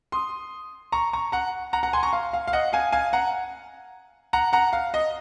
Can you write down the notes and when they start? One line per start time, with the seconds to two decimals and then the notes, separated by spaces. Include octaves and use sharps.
0.12 C6 D#6
0.92 A#5 C#6
1.13 A#5 C#6
1.32 F#5 A#5
1.73 F#5 A#5
1.83 F#5 A#5
1.93 G#5 C6
2.03 A#5 C#6
2.13 F5
2.33 F5
2.47 F5
2.53 D#5 F#5
2.73 F5 G#5
2.92 F5 G#5
3.13 F#5 A#5
4.33 F#5 A#5
4.53 F#5 A#5
4.73 F5
4.94 D#5